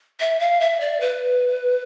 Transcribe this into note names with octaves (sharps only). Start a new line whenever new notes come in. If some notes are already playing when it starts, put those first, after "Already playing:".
E5
F5
E5
D5
B4